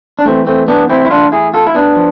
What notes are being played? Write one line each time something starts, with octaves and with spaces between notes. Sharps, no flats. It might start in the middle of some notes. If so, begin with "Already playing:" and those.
D4
A2 E3 A3 C4
A3 C4
B3 D4
C4 E4
E4
D4 F4
E4 G#4
F4 A4
E4
B3 D4
F3